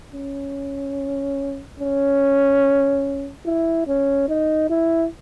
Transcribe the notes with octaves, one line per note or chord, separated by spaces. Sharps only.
C#4
C#4
E4
C#4
D#4
E4